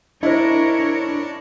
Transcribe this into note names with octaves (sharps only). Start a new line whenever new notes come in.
D4 E4 A#4 C5 C#5 D#5